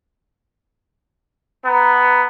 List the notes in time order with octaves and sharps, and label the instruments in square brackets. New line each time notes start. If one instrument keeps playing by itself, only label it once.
[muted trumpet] B3 [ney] A#5